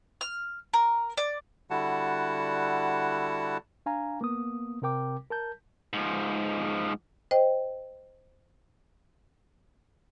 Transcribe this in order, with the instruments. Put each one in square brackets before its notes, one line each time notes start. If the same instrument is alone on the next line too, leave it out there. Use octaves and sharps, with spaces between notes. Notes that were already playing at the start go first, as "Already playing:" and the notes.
[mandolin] F6
A#4
D5
[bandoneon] D3 G3 E4 F#4 F#5 A5
[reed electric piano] D4 F5 G#5 A#5
A#3 B3 D#6
C3 C4 A#4 G5 D6
A#4 A5 G6
[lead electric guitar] G#2 F3
[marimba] C5 D#5 G5